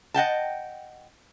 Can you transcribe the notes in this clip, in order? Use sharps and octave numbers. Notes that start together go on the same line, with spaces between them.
D#5 F#5 G5 A5